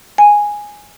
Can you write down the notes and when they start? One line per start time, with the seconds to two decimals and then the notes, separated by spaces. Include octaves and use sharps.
0.18 G#5